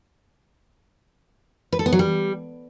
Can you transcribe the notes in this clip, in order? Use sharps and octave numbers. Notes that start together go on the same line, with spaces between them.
B4
A4
B3
F#3
G3